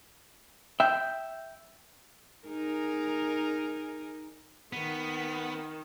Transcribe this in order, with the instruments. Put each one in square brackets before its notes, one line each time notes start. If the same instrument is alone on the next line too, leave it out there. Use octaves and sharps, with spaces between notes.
[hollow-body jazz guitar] E5 G5
[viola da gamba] D#4 G#4 A#4
[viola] D#3 [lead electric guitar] B3